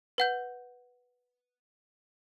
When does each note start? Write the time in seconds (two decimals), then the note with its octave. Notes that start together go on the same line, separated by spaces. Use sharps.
0.18 B4 F#5 G6